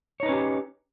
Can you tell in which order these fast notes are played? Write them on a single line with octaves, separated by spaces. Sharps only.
C#5 D#4 B4 C#4 G4